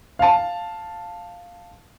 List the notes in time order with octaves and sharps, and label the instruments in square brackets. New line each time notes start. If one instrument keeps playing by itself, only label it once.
[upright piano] F5 A5